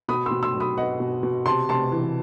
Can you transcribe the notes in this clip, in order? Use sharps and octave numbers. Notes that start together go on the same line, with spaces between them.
B2 B5 D#6
C6 E6
B2
C6 E6
F#3
B5 D#6
B3 D#5 F#5
B2
B2
C3 A5 C6
C3 A5 C6
E3